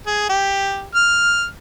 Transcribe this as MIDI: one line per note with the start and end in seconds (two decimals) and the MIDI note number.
0.06 0.25 68
0.29 0.86 67
0.95 1.45 89